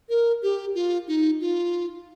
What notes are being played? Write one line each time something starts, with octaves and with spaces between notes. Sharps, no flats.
A#4
G4
F4
D#4
F4